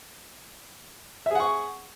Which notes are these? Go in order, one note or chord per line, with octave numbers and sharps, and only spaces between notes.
G#4 E5 F#5 C#6